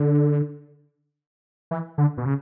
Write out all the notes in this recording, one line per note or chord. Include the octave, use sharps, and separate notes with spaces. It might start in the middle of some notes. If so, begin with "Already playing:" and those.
Already playing: D3
E3
D3
B2
C#3